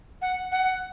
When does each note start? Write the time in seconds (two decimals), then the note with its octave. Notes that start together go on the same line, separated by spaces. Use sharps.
0.22 F#5
0.52 F#5